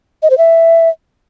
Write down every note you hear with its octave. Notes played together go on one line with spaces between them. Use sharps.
D#5
C5
E5